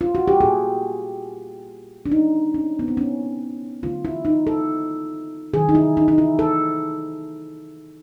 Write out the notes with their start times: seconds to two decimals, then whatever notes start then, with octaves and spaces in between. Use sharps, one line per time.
0.01 F4
0.15 F#4
0.28 G4
0.40 A#2 G3 A#3 G#4
2.06 D4
2.12 D3 G3 A#3 D#4
2.54 C#4
2.79 B3
2.88 C4
2.97 C#4
3.83 D3 F#3 A3 F4
4.05 E4
4.25 D#4
4.47 A4
5.53 C3 D#3 F#3 G#4
5.69 D#4
5.75 E4
5.97 D#4
6.08 D#4
6.18 E4
6.39 A4